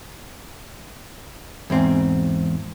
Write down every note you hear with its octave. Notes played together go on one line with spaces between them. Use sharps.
E2 G#2 C4